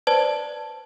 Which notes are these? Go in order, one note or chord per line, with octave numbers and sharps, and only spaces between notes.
B4 C5 D5 A5